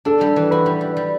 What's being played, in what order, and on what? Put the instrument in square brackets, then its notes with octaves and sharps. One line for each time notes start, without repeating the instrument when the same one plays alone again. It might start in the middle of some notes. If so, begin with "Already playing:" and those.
[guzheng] D4 [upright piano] A4
[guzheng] G3
E3
[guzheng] F#4 [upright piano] B4
[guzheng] G3
G3
G3